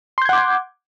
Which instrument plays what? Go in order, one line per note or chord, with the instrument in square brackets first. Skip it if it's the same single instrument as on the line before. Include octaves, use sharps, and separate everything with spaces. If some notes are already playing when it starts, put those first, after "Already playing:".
[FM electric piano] C6
G6
G#6
F#5
D6